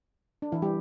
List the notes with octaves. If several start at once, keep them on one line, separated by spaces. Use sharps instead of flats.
D4
E3 E4
G3 G4